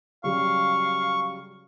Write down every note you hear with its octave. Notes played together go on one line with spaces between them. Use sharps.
C#3 F#3 G3 F5 C#6